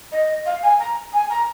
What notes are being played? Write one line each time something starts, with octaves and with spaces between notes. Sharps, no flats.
D#5
F5
G#5
A#5
G#5
A#5